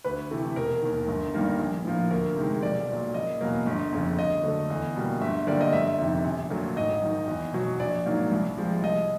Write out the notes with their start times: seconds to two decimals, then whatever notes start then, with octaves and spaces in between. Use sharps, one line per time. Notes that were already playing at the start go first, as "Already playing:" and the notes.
0.04 D2 B4
0.31 C3 E3 A3
0.56 E1 A#4
0.82 D#2 D#3
1.08 G1
1.34 G2 D#3 G3 A#3
1.59 A#1
1.85 A2 F3 A#3
2.11 D2 A#4
2.36 C3 D#3 G#3
2.62 B1 D5
2.89 A#2 F#3
3.14 F#1 D#5
3.41 E2 B2 F#3 A#3
3.66 G1
3.93 F2 C#3
4.19 D2 D#5
4.43 D3 F#3 A3
4.70 E2
4.96 B2 G3 A#3
5.21 G1 E5
5.47 F#2 D3 G3 A#3 D5
5.61 D#5
5.72 G1 E5
5.99 F2 C3 D#3
6.24 A#1
6.50 A#2 F#3 A3
6.77 G#1 D#5
7.02 F#2 D#3
7.27 E2
7.53 B2 F#3
7.80 A#1 D5
8.06 G#2 D#3 F#3 A#3
8.31 C2
8.57 C3 F3 G#3
8.83 C2 D#5